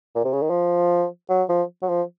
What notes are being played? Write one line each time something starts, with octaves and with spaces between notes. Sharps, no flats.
A#2
C3
C#3
D#3
F3
F#3
F3
F#3
F3